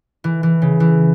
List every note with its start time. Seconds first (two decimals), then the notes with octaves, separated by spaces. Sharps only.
0.24 E3
0.43 E3
0.62 C#3
0.80 E3